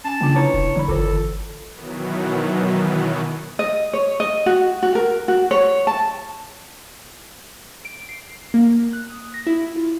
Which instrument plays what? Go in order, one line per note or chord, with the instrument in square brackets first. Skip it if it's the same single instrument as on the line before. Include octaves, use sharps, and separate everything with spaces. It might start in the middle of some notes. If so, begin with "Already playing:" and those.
[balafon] C#4 G#5 [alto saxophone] A5
[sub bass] C#3 [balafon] A#3 D4 F4
[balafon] E4 B4 A#5 [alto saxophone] C#5
[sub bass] E1
[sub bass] D3 [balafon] E3 B5
[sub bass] G1 [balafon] D3 F4 C5 [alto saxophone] A4
[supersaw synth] B2 D#3 E3 F#3 B3
[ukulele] D#5
C#5
D#5
F#4
F#4
A#4
F#4
C#5
A5
[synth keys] D7
C7
A#3
F#6
D#6
A#6
E4
F4